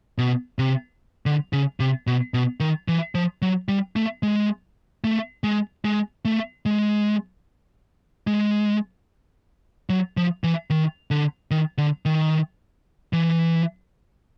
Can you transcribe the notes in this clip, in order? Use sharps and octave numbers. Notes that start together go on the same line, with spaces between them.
B2
C3
D3
C#3
C3
B2
B2
D#3
E3
F3
F#3
G3
A3
G#3
A3
G#3
G#3
A3
G#3
G#3
F#3
F3
E3
D#3
D3
D#3
D3
D#3
E3